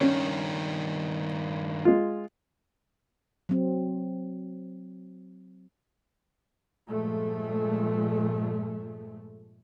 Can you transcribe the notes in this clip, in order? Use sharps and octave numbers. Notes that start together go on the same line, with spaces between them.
G2 D#3 C#4
G#3 F4
F#3 C4
G2 A#2 F3 G#3 A3